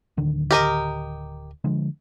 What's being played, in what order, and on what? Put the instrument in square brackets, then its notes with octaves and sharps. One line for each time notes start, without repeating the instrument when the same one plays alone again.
[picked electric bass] D1 D3 D#3
[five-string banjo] G4 A#4 D#5
[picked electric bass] D3 F3 G#3